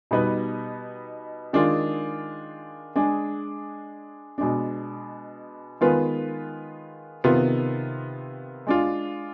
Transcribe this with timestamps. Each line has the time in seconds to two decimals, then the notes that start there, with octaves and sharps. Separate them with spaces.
0.11 B2 G3 B3 D#4 B4
1.53 D#3 G#3 D4 F4 G#4
2.96 G#3 D4 G#4
4.38 B2 G#3 D4
5.81 D#3 G#3 B3 F4 B4
7.24 C3 D#3 B3 F4
8.67 G#3 D4 F4